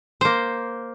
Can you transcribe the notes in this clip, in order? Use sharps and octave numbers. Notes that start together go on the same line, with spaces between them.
A#3 C5